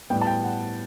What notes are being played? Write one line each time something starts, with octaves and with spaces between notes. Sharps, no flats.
A2 G3 B3 G5
A5
G5
F#5